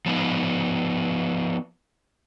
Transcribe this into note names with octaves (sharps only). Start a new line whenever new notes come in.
F3 B3 D#4